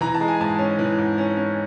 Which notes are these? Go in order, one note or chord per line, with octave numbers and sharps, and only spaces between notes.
E3 A#5
A5
G#3
G#5
G#2 A5
C#4
E3
G#2
C#4
C#4